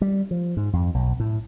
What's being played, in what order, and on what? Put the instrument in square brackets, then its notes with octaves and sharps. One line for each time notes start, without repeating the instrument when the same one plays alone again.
[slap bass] G3
F3
G#2
F2
B1
A2